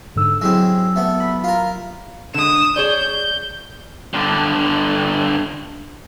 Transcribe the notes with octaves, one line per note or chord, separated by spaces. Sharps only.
G#2 D3 E6
F#3 G#3 C4 E4 G4 E6
A3 B3
B5
F4 A#4
D3 G#3 D#6 E7
G#4 C#5 D5 G6
G2 D3